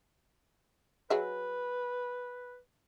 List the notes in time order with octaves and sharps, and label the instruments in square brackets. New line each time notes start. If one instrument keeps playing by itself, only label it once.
[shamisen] F#3 G#4 E5 [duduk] B4